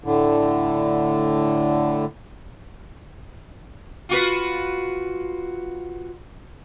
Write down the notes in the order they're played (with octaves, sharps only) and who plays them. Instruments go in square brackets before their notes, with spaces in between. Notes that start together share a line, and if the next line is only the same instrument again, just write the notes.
[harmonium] A2 D3
[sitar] F4 F#4 B4